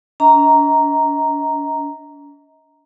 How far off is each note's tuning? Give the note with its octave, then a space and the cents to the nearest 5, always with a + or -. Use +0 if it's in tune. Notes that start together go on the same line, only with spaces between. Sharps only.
D4 -45 D#5 +35 A#5 +0